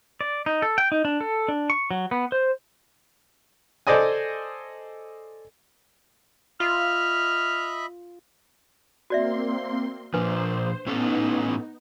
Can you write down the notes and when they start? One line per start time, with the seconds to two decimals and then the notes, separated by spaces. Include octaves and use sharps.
0.21 D5
0.46 D#4
0.62 A4
0.78 G5
0.92 D#4
1.05 D4
1.21 A4
1.48 D4
1.70 C#6
1.91 F#3
2.11 B3
2.32 C5
3.87 A4 C5 D5 D#5 G#5
6.60 F4 D#5 E5 B5 F6
9.10 A#3 C4 F#4 D5 E5 C6
10.14 A#2 F3 D4 B4 C5
10.87 A2 B3 C#4 D#4 A4